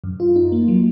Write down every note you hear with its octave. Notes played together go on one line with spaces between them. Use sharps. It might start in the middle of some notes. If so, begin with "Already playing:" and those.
F#2
F4
D#4
A#3
F#3